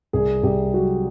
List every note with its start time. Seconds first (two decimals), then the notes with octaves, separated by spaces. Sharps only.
0.13 C2 G#4
0.43 C2 G4
0.74 F#3 F#4